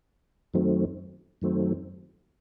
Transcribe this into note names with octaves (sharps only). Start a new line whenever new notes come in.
F#2 D#3 F#3 A3 C4
F#2 D#3 F#3 A3 C4